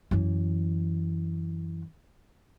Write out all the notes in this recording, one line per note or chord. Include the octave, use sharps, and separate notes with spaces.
F#2 E3